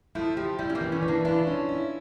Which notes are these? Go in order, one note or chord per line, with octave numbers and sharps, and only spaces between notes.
F3 A3 E4
F3 G4
G3 E4
C#4
G3 A#3
E3
A3 C#4
E3
A#3 D4
D4 E4 F4
C#4
E4